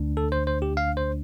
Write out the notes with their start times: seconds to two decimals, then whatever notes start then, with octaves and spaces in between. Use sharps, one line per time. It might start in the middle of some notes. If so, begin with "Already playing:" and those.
Already playing: D2 D3 A3 D4
0.17 A4
0.32 C5
0.47 C5
0.62 G4
0.77 F5
0.97 C5